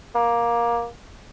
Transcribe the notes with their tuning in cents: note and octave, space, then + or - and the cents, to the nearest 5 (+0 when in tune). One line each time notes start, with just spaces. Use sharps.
A#3 +15